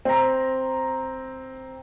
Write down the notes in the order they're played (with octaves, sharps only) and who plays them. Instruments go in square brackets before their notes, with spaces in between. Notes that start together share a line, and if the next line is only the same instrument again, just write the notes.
[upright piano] C4 A#5